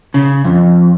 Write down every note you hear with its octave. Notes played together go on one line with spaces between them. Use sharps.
C#3
F2